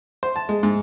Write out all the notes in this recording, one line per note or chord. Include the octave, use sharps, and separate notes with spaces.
C5
A5
G#3
G#2